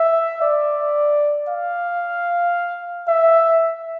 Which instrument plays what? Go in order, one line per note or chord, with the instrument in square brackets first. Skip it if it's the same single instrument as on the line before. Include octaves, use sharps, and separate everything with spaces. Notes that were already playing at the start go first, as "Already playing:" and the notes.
Already playing: [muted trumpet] E5
D5
F5
E5